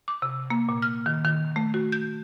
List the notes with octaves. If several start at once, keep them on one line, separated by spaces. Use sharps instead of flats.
D6
C3
A#3
A#2
F6
D#3
D#3
A3
F#4
G6